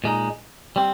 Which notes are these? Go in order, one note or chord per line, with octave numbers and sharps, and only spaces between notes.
A#2 G#3 D#4
G3 C4